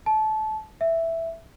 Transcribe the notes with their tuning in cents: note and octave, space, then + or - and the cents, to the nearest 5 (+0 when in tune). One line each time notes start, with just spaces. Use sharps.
A5 -25
E5 +0